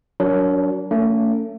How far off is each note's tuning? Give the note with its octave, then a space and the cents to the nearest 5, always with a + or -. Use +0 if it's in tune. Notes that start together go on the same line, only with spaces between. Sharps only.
F#3 +0 D4 -35 A#4 +0
A3 +35 C#4 +35